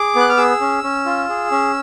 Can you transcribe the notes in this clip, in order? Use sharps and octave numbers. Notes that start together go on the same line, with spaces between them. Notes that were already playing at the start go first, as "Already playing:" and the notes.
Already playing: G#4 D6
B3 F#6
F6
G#4 E6
C#4
C#4
F4
G#4
C#4